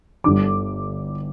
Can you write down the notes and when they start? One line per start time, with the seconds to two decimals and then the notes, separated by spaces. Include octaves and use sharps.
0.24 G1 G2 D3 G3 D6